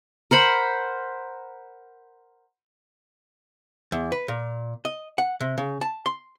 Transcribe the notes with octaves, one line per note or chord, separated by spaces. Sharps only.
A#4 C5 F#5 B5
E2
B4
A#2
D#5
F#5
C3
C#3
A5
C6